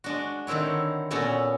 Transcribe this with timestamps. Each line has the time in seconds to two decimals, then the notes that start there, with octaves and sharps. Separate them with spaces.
0.04 G#3 D4 F#4
0.47 D3 D#3 C4 E4 C#5
1.11 A#2 B3 C#4 F#4 A4 C#5